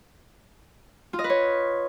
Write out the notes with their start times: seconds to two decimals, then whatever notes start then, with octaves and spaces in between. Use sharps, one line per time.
1.13 F4
1.19 D#5
1.24 B4
1.30 C#5